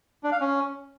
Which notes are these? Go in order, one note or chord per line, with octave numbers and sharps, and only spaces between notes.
D4
F5
C#4